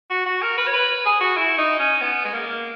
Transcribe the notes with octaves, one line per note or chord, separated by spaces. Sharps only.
F#4
F#4
A#4
B4
C#5
B4
G#4
F#4
E4
D#4
C#4
B3
G#3
A#3